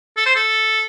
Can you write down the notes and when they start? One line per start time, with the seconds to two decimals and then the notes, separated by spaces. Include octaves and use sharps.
0.17 A4
0.26 C5
0.36 A4